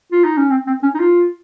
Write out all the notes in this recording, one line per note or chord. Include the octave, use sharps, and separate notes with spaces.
F4
D#4
C#4
C4
C4
C#4
D#4
F4